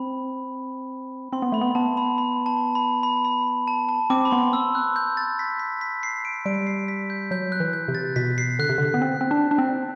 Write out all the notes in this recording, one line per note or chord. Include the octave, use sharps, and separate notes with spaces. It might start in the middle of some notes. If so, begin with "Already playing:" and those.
Already playing: C4 B5
C4 C6
B3
A3 B5
B3
B3 A5
B5
B5
A5
B5
B5
B5
A5
A5
C4 D6
B5
B3 C6
E6
F#6
G6
A6
B6
B6
B6
C7
D7
G3 D7
C7
B6
G6
F#3 G6
F#6
E3
G6
C3
A6
B2 B6
C7
D3 F#6
C3
D3
B3
C4
C4
D4
D4
C4